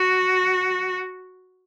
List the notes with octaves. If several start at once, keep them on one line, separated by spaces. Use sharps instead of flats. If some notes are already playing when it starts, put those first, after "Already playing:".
Already playing: F#4